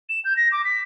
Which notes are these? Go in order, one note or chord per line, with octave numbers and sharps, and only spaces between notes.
E7
G6
A#6
D6
B6